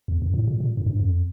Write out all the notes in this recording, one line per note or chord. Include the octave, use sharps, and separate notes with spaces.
E2
F2
A2
A#2
A#2
F#2
G2
F2